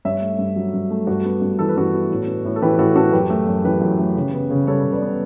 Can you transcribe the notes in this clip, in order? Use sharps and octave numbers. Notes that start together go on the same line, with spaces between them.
G2 C#5 E5
A3
G2
F#3
G2
A3
G2 F#4
B3
G2
E3 A4
B4
G2 F#4 A4
B3
A2
B3
A2
A4
E3 G4 B4
A2 F#4 A4
B3 F#4 A4
F#2 G4 B4
A3
F#2
E3 G4 B4
F#2
A3
C#3
B3
C#3
G3 A4 C#5
C#3
B4 D5
B3